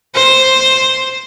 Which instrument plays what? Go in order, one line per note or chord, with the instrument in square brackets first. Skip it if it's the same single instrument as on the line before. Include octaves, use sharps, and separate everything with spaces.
[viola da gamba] C5